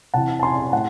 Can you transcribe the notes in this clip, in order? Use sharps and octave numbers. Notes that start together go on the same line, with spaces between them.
C3 E3 F#5 A5
A5
G#5 C6
A2 F#5 A5